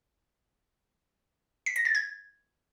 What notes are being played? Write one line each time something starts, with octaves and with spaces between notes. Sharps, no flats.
B6
A#6
A6
G#6